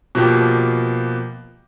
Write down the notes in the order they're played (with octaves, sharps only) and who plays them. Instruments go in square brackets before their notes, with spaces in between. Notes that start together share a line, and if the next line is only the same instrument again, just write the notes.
[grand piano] B2 F3 A#3 G4